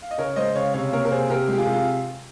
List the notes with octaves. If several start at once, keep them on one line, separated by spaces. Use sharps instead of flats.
F5
D#5
C#3 A#4 C#5
G#3 C5 D#5
C#3 C#5 F5
C3 C#5 F5
A#3 A#4 C#5
A#4
C3 G#4 C5
C3 G4 A#4
G#3 G4
F4 G#4
C3
F4